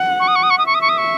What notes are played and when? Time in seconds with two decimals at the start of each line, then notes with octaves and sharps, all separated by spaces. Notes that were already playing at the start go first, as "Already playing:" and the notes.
Already playing: F#5
0.20 C#6
0.28 D#6
0.36 C#6
0.43 D#6
0.50 C#6
0.58 D#6
0.62 E5 C#6
0.75 D#6
0.81 C#6
0.89 D#6
0.98 C#6